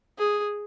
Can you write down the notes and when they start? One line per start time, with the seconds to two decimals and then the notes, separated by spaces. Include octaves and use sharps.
0.19 G#4